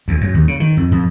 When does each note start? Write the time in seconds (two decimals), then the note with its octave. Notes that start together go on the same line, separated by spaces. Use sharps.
0.08 D2
0.21 F#2
0.34 D#2
0.48 C#3
0.60 D#3
0.77 F2
0.91 F2